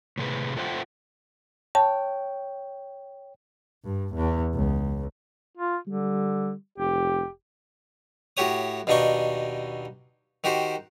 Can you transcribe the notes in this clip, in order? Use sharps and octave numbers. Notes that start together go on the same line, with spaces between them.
A2 C3 G#4 B4
F4 A4 C5 E5 F#5 G5
C#5 G5 A5
G2
E2
C#2
F4
D3 G3
F1 G4
A2 F#4 G4 C#5 D#6
D#2 B2 D4 D#4 D#5 C#6
D#3 F#4 G4 C5